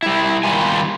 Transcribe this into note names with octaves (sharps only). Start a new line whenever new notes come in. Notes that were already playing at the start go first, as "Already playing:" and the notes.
G3 E4
D#3 G3 F4 G#5